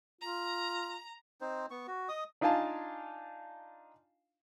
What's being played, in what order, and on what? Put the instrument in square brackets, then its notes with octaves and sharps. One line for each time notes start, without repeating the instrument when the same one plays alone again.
[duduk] F4 [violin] A#5
[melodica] C4 D#4 C5
B3 C#6
F#4
D#5 D#6
[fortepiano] D4 D#4 F4 F5 G#5 A5